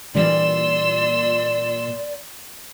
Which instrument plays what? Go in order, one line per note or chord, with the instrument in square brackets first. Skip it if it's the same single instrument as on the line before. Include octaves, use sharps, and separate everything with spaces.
[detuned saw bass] A#2 [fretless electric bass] E3 G3 D4 [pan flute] D5 [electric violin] C6 E6